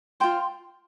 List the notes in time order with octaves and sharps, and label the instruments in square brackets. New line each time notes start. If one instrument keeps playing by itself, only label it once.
[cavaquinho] F4 C5 G5 C6